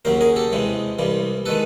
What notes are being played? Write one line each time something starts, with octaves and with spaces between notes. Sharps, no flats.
D#2 C#3 F#3 A#4 C5
G#4 A#4
G4 A4
E2 C3 E3 G#3
C2 C3 E3 G3
D#3 G#3 A4 B4